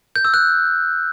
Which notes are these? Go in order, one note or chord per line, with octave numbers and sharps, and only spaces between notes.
G6
E6
F#6